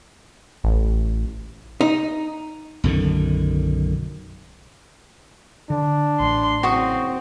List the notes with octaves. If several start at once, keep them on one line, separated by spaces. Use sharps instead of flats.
A1
D#4
B1 F#2 D3 D#3
D3 D4
A1 C6
F#1 C4 F#4 C#6 D#6